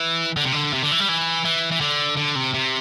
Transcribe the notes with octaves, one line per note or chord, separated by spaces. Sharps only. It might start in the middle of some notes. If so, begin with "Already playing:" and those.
Already playing: E3
D3
C3
D3
C3
D3
E3
G3
E3
E3
E3
D3
D3
C3
C3